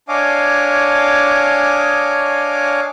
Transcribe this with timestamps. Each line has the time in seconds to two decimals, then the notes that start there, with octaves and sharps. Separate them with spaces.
0.08 D4 C#5 D#5 F5 G#5 D6